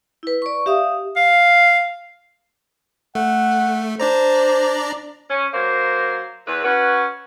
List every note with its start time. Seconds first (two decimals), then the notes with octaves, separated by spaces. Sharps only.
0.23 E4 B4
0.42 D5 C#6
0.66 G4 E5 F5 D#6
1.16 F5
3.15 A3 F#5
4.00 D4 C5 D5 A#5
5.30 C#4
5.54 F#3 A#3 C5
6.47 E2 B4
6.64 C#4 F#4 B4